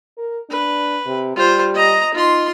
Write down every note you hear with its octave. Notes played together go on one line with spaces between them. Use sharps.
A#4
D4 B4
C3
G3 F4 C5
D#5 A#5
D#4 F4 C6